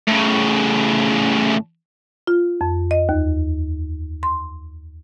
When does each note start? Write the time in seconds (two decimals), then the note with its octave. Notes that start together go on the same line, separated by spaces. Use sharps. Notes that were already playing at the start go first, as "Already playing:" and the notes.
0.07 A2 C#3
2.27 F4
2.61 F2
2.91 D#5
3.09 D#2
4.23 C6